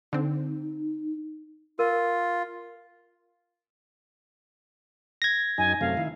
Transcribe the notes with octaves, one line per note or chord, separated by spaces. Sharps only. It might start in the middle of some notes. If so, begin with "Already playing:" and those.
D3 C4 D#4
F4 A#4
G#6 A#6
F#2 D#4 G#5
F#2 C3 A3 F5
D#3 E4